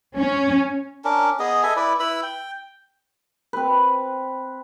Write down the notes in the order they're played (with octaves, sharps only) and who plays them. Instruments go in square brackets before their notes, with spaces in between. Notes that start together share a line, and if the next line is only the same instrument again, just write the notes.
[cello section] C#4
[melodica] C#4 D4 A#4
B3 G#4 D#5
A4 D#5 E5 G#5
E4 B4 D5
E4 B4 B5 E6
G5
[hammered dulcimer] C4 B4